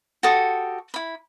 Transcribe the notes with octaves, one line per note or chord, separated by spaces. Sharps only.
F#4 G4 A4 D#6
E4 B5